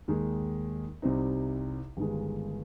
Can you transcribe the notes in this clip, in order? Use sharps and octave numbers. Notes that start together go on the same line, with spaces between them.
D#2 D#3 G#3
C2 C3 G3 C4 D#4
G1 G2 D#3 G#3